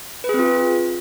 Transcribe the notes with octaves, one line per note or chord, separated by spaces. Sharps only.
C4 F4 G#4 B4